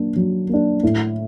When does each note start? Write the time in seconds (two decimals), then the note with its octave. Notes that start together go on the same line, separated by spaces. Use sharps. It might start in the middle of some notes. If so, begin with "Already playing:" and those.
Already playing: F#3 A#3 D4
0.16 F#3
0.49 A#3 D4
0.83 A2